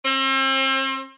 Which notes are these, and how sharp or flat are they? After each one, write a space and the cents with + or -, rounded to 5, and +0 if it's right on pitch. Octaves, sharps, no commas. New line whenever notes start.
C4 +40